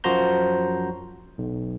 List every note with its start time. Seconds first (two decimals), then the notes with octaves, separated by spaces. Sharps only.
0.04 F#2 F3 F#4 C5 A#5 G6
1.38 B1